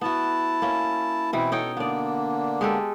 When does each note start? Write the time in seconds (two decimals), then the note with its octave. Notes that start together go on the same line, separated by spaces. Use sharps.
0.01 B3 E4 F#4 A5
0.62 A#3 C#4
1.33 B2 E3 C4 E4
1.52 D#4 A4 C#5 G5
1.77 D3 A#3 B3 D4 D5
2.61 G#3 G4 A4